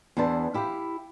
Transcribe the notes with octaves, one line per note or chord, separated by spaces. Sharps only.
E2 E3 D4 C5 A5
E4 G4 F5 G5